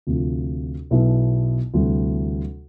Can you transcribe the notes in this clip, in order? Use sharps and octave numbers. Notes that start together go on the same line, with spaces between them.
D2 C3 F3
B1 B2 B3 E4
D2 C3 E3 G3